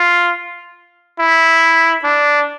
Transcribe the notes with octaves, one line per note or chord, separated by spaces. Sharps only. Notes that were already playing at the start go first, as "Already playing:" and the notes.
Already playing: F4
E4
D4